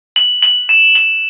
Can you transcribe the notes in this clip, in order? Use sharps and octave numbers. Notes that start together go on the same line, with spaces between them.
F#7
F#7
E7
F#7